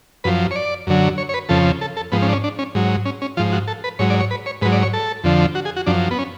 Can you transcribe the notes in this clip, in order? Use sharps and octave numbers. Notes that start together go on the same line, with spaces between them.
F#2 F3 B4
C#5
D5
F#2 D3 F#3
C#5
C#5
B4
F2 C#3 F3 A4
A4
A4
G#2 F3 B3
C#4
D4
C#4
D4
C#4
G#2 F#3
C#4
C#4
G#2 F3 F4
F#4
A4
B4
G#2 F#3 C#5
D5
C#5
B4
C#5
G#2 F#3 B4
D5
C#5
A4
F2 D3 F3
F#4
G#4
F#4
F#2 F3 D4
B3
C#4